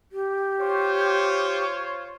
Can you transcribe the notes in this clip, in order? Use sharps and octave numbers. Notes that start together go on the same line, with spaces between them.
G4
F4 C5 C#5